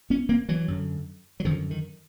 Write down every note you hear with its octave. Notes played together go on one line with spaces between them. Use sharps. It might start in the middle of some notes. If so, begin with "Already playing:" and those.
B3 C#4
A#3 C4
E3 F#3
F#2 D3
F#3
F#2 D3 D#3 F3
D#3